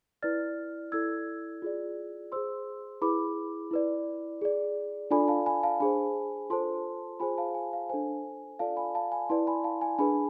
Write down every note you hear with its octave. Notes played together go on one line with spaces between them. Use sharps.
E4 B4 D5 F6 A6
E4 A4 D5 E6 G#6
F4 G#4 D5
G#4 C5 C6 E6
E4 G#4 B4 B5 D6
E4 B4 D5
G#4 D5
D4 F4 A4 D5 G#5 B5
F5 A5
G#5 B5
F5 A5
D4 G#4 C5 G#5 B5
F4 A4 C5 A5 C6
F4 G#4 C5 G#5 B5
F5 A5
G#5
F5
D4 A4 C5 G#5
F4 A4 D5 F5 A5
G#5 B5
F5 A5
G#5 B5
E4 B4 D5 A5 C6
G#5 B5
F5 A5
G#5
D4 G#4 B4 G#5 B5